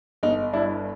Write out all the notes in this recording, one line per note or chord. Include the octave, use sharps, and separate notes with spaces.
G1 D#4
G2 D4 E4